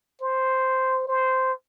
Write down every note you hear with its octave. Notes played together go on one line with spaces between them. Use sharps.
C5
C5